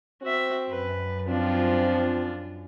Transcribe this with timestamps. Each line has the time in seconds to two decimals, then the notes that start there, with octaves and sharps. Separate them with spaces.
0.22 C4 F#4 E5
0.71 F#2 B4
1.28 F3 C4 D4 F4